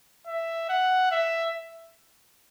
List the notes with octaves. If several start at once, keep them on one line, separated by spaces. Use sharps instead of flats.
E5
F#5
E5